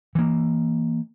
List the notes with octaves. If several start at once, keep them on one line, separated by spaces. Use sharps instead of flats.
E3 A#3